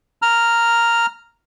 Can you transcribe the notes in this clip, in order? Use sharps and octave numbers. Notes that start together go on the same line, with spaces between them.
A#5 F6